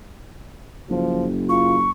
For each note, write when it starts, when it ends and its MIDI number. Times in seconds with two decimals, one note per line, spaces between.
0.90 1.90 30
0.90 1.26 53
1.49 1.77 65
1.49 1.91 85